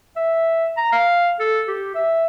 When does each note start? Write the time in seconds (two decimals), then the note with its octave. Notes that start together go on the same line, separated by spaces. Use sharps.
0.16 E5
0.77 A#5
0.92 F5
1.40 A4
1.68 G4
1.95 E5